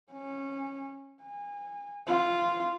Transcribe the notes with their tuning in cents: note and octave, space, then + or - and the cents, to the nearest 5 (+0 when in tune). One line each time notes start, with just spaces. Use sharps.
C#4 -20
G#5 -30
F4 -5